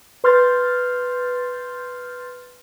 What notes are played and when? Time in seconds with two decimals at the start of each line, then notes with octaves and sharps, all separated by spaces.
0.24 B4 C6 F6 G6 A6